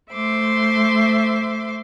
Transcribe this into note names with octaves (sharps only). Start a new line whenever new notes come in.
A3 C5 E5 C6 D6